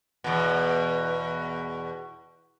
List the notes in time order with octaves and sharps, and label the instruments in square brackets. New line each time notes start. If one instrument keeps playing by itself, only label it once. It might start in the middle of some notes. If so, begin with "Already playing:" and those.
[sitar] E2 B2